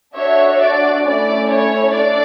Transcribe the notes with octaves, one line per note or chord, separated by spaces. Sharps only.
D4 F#4 A4 C#5 E5
D5
A3 C#4 E4 D5
C#5
D4 A4 D5